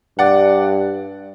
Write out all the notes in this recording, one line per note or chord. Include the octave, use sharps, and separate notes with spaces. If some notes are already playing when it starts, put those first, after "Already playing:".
G2 D5 F#5